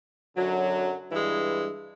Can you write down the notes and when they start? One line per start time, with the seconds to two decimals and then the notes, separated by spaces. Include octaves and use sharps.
0.37 F#2 D3 F#3
1.10 G2 E3 G#3